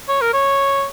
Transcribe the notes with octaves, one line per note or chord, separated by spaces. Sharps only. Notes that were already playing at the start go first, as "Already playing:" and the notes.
C#5
A#4
C#5